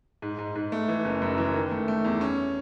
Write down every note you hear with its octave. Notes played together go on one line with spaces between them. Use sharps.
G#2
G#2
G#2
A3
E3
F#1
F#2
E3
D#3
A3
A3
E2
C#4